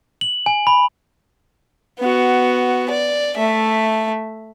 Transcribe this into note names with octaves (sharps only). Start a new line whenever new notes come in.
F#7
G#5
B5
B3 F#4
D5
A3 E5